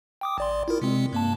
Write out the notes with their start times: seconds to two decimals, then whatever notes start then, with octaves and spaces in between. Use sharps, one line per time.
0.21 G5 D6 D#6
0.38 A1 D5 C6
0.68 E4 F4 A#4
0.82 C3 G#3 C4
1.13 G2 A#3 A5